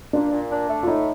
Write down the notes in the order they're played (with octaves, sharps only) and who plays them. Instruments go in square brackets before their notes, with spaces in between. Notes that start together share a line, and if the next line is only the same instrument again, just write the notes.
[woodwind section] A#2 [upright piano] D4
[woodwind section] A#2
D4
A3
[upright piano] F4
[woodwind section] A2 [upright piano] D#4